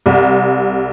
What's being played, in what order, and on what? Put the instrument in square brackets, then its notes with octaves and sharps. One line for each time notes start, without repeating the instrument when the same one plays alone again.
[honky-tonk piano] C2